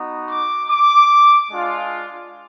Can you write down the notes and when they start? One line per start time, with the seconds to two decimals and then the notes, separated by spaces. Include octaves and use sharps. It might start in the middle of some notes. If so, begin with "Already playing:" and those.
Already playing: B3 D#4 F#4
0.29 D6
0.69 D6
1.51 G#3 D4 F4